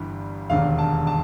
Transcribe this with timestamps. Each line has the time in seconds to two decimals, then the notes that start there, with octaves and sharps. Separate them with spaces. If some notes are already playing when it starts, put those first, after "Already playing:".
Already playing: G1 G2 E3 G3
0.50 E1 D#2 D3 F5
0.79 A5
1.07 A5